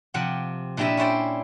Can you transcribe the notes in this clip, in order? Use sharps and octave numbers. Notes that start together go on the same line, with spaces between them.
C3 F3 F#5 G5
A#2 D4 E4 G4 D#5 E5
C#4 E4 C5 D5 G5